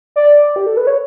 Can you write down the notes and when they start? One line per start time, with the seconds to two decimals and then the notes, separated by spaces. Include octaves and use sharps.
0.16 D5
0.56 G4
0.66 A4
0.77 B4
0.87 C#5